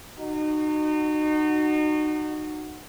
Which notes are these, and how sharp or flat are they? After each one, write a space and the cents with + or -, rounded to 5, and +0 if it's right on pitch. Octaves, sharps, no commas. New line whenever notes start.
D#4 -35 F#4 +0